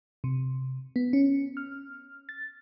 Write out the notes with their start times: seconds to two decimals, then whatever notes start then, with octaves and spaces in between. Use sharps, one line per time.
0.24 C3
0.96 B3
1.13 C#4
1.57 F6
2.29 A6